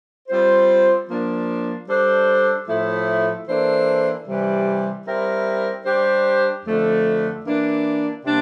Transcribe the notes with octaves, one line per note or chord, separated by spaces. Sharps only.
G3 C4 F4 C5
F3 A#3 D4
G3 D4 A4 C5
A2 F3 A3 E4
E3 A#3 D4 A4 C5
C3 E3 G3
G3 C4 E4 A#4
G3 D4 G4 C5
F2 D3 A3
E3 A#3 D4
C3 G3 A#3 D4